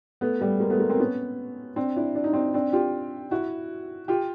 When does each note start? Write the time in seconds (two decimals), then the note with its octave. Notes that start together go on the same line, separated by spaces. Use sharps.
0.21 A3 B3
0.41 G3 A3
0.60 G#3 A#3
0.70 A3 B3
0.79 G#3 A#3
0.89 A#3 C4
1.00 B3 C#4
1.76 C4 D4
1.96 D4 E4
2.15 D4
2.24 D#4
2.33 C4 D4
2.54 C4 D4
2.73 F4 G4
3.31 E4 F#4
4.08 F4 G4